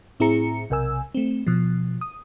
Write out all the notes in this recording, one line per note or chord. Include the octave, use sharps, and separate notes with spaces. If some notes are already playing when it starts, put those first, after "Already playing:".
A2 C4 E4 G#4 A#5 C#7
B1 C3 A#4 G#5 E6
A3 C4
B2 F3
D#6